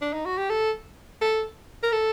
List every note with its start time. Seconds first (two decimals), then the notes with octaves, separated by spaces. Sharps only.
0.02 D4
0.14 D#4
0.25 F#4
0.38 G4
0.50 A4
1.21 A4
1.83 A#4
1.92 A4